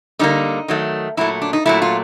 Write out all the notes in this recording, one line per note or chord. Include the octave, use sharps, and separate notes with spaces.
D3 G3 A#3 D#4
D#3 F#3 A3
A#2 F#3 A3 E4
D4
D#4
A#2 F#3 A3 E4
F4